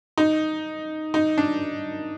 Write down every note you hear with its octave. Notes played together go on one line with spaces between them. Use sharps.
D#4
D#4
D4